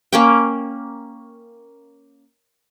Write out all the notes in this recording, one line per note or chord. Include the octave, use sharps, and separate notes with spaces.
A#3 C#4 G5